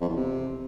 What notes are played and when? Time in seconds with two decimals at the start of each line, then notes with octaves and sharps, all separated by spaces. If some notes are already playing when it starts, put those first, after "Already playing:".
0.01 F2
0.09 E2
0.16 C3